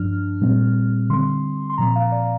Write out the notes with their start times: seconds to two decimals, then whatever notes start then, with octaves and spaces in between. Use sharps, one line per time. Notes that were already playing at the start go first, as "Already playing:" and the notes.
Already playing: G2 F3 D4 F6
0.41 A#2 G3 C4
1.10 D3 G3 C4 C6
1.70 C6
1.78 A#2 F3 C4 A#5
1.96 F5
2.12 D5